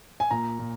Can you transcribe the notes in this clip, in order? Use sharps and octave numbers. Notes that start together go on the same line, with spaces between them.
G#5
A#2 A#5
A#2